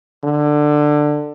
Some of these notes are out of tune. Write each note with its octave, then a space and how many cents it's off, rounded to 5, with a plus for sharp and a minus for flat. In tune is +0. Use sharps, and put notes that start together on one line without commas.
D3 +15